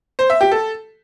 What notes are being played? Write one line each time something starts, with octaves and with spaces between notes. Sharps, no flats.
C5
E5
G4
A4